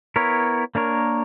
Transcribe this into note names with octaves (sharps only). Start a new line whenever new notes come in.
B3 E4 A#4 C#5
A#3 D4 A#4 C#5